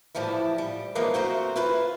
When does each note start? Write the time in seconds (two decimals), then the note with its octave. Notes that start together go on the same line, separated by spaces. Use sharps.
0.15 A2 E3 F3 G3 E4
0.58 G3
0.95 D3 E3 F3 G#3 A#3 B3
1.14 A3 C4 F#4 A#4 C5
1.56 E4 F4 B4 C5